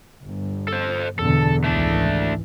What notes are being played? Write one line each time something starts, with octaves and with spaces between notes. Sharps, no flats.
G1
A4 C5
E2 B2 D3 A4
G#1 C#2 E3 A3 D4